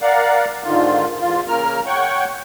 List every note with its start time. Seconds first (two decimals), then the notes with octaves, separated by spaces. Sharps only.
0.02 A#4 D5 F5 F#5
0.64 G#2 D3 D#3 F4
1.20 E2 F4
1.48 C#3 A#3 A#4 F6
1.86 C#5 F#5 G5 C#6